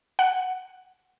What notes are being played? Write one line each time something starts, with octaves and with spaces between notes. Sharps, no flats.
F#5